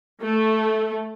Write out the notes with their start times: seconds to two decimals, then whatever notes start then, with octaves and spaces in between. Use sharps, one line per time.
0.21 A3